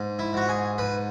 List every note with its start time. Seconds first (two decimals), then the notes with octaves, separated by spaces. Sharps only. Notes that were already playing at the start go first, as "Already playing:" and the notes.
Already playing: G#2
0.19 E4
0.33 G#2 F#4
0.49 G#4
0.78 G#2 B4